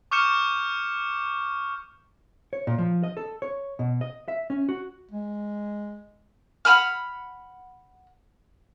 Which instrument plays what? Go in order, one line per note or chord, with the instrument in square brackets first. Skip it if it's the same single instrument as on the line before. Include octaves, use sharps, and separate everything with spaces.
[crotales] C#6 D6 F6 G6 C#7 E7
[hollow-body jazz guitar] C#5
A#2
F3
D#5
A4
C#5
B2
D#5
E5
C#4
F#4
[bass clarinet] G#3
[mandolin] F#5 G#5 B5 F6